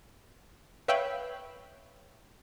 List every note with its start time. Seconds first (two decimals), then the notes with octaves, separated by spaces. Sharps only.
0.88 B4 C#5 E5 F5 G5 B5